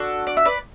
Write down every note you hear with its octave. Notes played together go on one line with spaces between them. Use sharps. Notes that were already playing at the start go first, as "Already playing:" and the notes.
Already playing: D4 F#4 A4
D5
E5
B4 D5